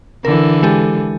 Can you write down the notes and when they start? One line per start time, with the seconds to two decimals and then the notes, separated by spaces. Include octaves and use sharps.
0.25 D3 E3 A#4
0.63 G#3 G4 A4